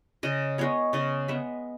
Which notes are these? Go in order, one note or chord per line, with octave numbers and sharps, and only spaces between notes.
C#3 D#5
G#3 B3 C#5
C#3 D#5
G#3 B3 E5